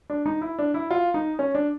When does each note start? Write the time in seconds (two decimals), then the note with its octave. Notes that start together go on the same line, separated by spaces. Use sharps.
0.10 D4
0.26 D#4
0.41 E4
0.59 D4
0.74 E4
0.91 F4
1.14 D#4
1.39 C#4
1.55 D4